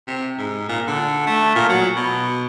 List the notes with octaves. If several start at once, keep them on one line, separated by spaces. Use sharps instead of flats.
C3
G#2
A#2
D3
A3
A#2
F#3
B2